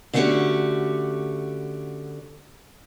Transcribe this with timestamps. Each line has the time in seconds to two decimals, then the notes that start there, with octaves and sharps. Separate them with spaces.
0.13 D3 A3 B3 C#4 F#4 G4